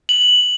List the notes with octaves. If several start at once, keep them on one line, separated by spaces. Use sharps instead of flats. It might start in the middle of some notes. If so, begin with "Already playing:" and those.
F#7